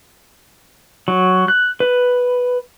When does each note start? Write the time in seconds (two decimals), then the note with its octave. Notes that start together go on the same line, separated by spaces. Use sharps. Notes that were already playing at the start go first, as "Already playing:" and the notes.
1.08 F#3
1.48 F#6
1.80 B4